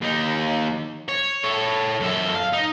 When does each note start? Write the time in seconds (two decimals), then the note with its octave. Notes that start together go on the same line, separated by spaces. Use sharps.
0.01 D#2 D#4
1.09 C#5
1.44 A4 C#5
2.00 F#2 A4
2.35 F5
2.53 D#4